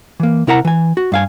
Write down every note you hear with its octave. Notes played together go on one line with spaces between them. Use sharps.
E3 A#3
C3 E4 A#4 F#5 A#5
E3 G#5
F#4
G2 F5 G#5